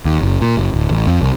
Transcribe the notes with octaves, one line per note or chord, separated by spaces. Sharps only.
D#2
F#1
A#2
F#1
D1
A1
F2
C2